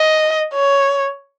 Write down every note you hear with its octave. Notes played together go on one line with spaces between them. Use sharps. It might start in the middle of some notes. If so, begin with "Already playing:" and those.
Already playing: D#5
C#5